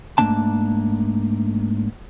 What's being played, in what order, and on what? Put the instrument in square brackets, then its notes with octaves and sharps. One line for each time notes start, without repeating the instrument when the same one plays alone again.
[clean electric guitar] G#2 A3 A#3 D4 A5